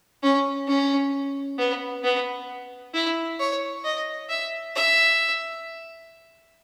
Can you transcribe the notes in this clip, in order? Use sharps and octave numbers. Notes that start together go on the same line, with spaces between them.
C#4
C#4
B3
B3
E4
C#5
D#5
E5
E5